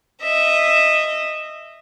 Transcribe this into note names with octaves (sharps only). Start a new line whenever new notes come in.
D#5 E5